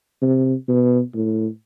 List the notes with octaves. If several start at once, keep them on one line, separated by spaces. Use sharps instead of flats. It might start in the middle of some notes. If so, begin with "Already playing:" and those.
C3
B2
A2